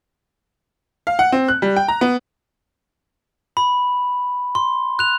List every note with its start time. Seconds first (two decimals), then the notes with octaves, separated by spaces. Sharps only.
1.07 F5
1.19 F#5
1.32 C4
1.48 F#6
1.62 G3
1.76 G5
1.88 A#5
2.01 B3
3.57 B5
4.55 C6
4.99 F#6 F7